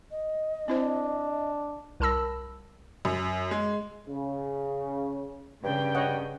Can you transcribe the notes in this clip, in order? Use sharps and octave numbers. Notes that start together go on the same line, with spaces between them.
D#5
C4 D4 E4 C5
C2 A#4 A5 B5 E6 A#6
F#2
G#3
C#3
G2 C#3 G5
C#5 D#5 F#5